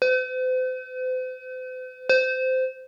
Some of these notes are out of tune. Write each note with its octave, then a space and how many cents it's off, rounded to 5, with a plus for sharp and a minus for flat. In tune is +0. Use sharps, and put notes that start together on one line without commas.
C5 -45
C5 -20